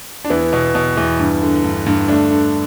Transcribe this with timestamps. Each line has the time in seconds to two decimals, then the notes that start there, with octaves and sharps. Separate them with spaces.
0.24 D4
0.30 E2 B3 E4
0.53 B2
0.75 B2
0.97 E2
1.19 G2
1.42 D3
1.64 G2
1.86 G2
2.08 D3 A3 D4
2.31 D3